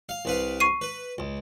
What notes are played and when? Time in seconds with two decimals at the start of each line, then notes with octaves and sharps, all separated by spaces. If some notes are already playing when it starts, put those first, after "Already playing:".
0.09 F5
0.25 C2 B4 F5
0.60 C#6 C7 D#7
0.81 B4
1.18 C#2